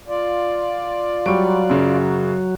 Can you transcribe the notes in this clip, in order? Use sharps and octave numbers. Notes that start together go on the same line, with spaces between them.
F4 D5
F#3 G3 C#6 D7
F#2 C#3